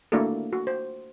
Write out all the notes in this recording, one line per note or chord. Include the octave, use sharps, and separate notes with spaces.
A3 A#3 D4 E4 F#4 A4
F#4
C5